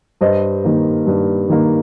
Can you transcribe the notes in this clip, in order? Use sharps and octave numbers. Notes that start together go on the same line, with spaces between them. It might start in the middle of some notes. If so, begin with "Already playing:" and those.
G2 C5 D#5
D#3 A#3
G2
D#3 A#3